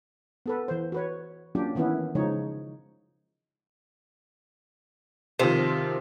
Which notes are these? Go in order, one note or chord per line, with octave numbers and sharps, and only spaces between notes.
B3 A4 B4
E3 C5
F#4 B4 C#5
F#3 A#3 C#4 D4 F4 G4
D#3 E3 B3 C#4 E4
C#3 F3 G#3 D#4 C#5
C3 D#3 F3 C4 F4